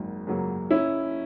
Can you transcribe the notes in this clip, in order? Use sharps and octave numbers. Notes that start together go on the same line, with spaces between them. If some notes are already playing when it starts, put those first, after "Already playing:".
Already playing: G#1 F#2 C#3 A#3
F#2 C#3 F#3 A#3
F#1 C#4 E4